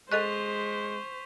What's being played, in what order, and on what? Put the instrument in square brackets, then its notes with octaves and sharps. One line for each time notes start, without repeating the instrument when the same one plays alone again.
[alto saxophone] G#3 [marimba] A4 D#5 F#6 [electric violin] C5 [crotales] C#6 B6 F7